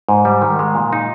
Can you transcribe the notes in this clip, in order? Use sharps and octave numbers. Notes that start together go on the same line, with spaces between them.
G#2
G3
D#3
G#3
A#2
D#4